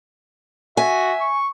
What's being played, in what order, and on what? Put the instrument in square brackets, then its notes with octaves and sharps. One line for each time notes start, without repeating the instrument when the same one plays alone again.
[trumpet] F#4 [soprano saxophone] E5 [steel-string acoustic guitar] G#5
[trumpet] C#6